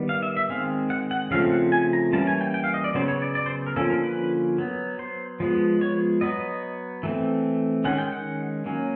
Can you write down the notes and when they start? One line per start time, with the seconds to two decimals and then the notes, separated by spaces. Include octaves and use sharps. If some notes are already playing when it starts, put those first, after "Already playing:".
Already playing: D#3 G3 B3
0.09 F5
0.23 E5
0.37 E5
0.49 D#3 G#3 C4 F5
0.90 F#5
1.11 F#5
1.31 C#3 F3 A3 C4 F5
1.52 F#5
1.72 G#5
1.93 A#5
2.13 E3 G3 A#3 C#4 A5
2.27 G#5
2.41 G5
2.54 G5
2.64 F5
2.74 D#5
2.84 D5
2.94 C#3 F#3 B3 C5
3.08 C#5
3.22 D5
3.35 D5
3.46 C5
3.67 A#4
3.76 D3 F3 A#3 C#4 A4
3.90 A#4
4.03 B4
4.58 F#3 B3
4.99 C5
5.40 F3 G#3 B3
5.81 C#5
6.21 F#3 B3 D#5
7.03 E3 A3 C4
7.84 D#3 G#3 C#4 F#5
7.98 G5
8.12 F#5
8.66 F#3 A#3 C#4